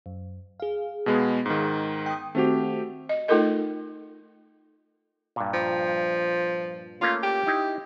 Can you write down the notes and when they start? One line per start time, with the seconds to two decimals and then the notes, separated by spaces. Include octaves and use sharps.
0.06 F#2
0.60 G#4 F5
1.06 B2 G#3 B3
1.46 G#2 D#3
2.06 G5 D#6
2.35 D#3 A3 C4 F#4 G4
3.09 D#5
3.28 A3 D#4 F4 A4 A#4 D#5
5.36 G2 A#2
5.54 F3
7.01 A3 A#3 C#4 F4
7.23 G4
7.47 D#4 E4